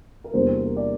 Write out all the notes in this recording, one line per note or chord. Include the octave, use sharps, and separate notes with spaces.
A#4
E2 C3 G3 A#3 D4 C5
A#4
D5